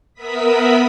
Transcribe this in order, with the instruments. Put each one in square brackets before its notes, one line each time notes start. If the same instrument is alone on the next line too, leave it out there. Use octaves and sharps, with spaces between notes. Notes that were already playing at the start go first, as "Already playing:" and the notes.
[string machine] B3 A#4 E5 B5 D#6 B6